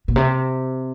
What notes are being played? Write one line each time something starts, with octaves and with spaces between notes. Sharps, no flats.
A#2
C3